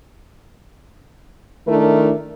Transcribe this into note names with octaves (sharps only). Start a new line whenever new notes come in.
D#3 A3 D4 E4 A#4